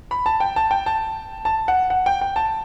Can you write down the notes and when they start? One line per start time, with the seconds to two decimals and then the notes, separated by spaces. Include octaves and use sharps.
0.11 B5
0.26 A5
0.40 G5
0.56 A5
0.71 G5
0.86 A5
1.45 A5
1.68 F#5
1.90 F#5
2.06 G5
2.21 G5
2.36 A5